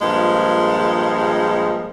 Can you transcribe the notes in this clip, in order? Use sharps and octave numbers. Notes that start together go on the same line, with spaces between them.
G2 A#2 F3 G#3